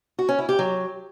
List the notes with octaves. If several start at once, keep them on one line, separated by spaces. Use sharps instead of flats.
F#4
C#4
E4
G4
F#3